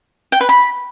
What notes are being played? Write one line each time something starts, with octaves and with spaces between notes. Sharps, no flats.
G5
B4
B5